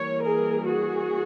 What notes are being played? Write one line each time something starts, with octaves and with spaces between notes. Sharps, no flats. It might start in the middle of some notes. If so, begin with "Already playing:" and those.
Already playing: E3 G3 A#3 C#5
G#4 A#4
F#4 G#4